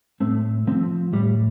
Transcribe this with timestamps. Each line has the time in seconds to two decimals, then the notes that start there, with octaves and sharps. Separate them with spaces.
0.20 A2 A3 C4
0.67 F3 A3 C4
1.13 A2 G3